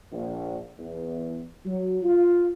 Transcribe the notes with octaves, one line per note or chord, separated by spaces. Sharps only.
A#1
E2
F#3
F4